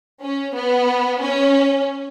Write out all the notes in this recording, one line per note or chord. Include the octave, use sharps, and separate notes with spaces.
C#4
B3
C#4